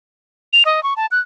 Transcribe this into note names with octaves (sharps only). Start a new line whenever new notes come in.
F7
D#5
C#6
A5
F#6